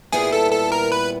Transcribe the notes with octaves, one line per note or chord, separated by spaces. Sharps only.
A#2 G3 B3 E4 G#4
A4
A4
A#4
B4